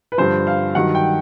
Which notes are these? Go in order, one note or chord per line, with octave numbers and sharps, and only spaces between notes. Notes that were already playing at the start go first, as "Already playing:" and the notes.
B4
G2 D3 F3 C5
F5
G2 D#3 F#3 F#5
G5